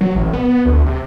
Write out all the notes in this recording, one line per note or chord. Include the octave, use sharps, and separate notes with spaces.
F#3
A1
B3
D2
C3